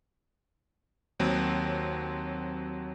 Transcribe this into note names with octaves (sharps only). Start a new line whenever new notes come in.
D#2 F#3 C4